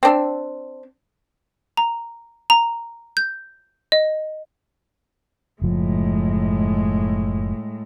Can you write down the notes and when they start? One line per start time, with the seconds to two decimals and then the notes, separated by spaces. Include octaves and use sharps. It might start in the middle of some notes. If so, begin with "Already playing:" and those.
0.03 C4 D4
1.77 A#5
2.50 A#5
3.17 G6
3.92 D#5
5.62 F#1 A2 F3 G#3